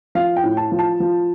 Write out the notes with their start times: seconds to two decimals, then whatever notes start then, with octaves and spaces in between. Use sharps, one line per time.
0.15 F3 F5
0.36 G5
0.44 A2
0.57 A5
0.72 F3
0.79 A5
1.00 F3